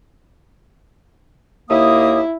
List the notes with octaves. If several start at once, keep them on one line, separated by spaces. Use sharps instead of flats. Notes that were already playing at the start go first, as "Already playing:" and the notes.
D#2 A#3 E4 D#6